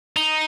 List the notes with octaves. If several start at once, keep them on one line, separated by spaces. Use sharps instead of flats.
D#4